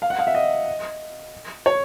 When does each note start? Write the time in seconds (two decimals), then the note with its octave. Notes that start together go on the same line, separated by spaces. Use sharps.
0.02 F5
0.10 F#5
0.19 F5
0.27 E5
0.35 D#5
1.66 C#5